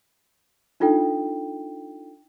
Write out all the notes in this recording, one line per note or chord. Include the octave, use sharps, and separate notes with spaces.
D4 D#4 F4 A4 G5